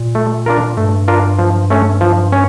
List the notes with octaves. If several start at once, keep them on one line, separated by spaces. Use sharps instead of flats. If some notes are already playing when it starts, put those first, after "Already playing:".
Already playing: A#2
A3
D4 F4 A#4
G2 A3
D4 F4 A#4
F3
A3 C#4
F3
C#4